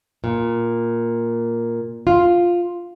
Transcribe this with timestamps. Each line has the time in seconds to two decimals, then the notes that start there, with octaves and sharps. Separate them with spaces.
0.24 A#2
2.07 F4